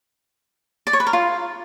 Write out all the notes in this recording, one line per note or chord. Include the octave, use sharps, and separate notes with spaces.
D5
C#5
B4
A#4
F4